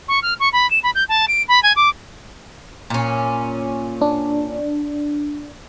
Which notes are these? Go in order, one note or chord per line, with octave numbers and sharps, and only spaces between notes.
C#6
F6
C#6
B5
E7
B5
G6
A5
D7
B5
G#5
D6
A#2 C#4
D4